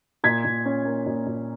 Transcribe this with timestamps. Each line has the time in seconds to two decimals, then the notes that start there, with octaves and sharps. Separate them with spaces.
0.24 A#2 G#6 B6
0.44 A#2
0.65 C#4
0.85 A#3
1.06 A#2
1.26 A#2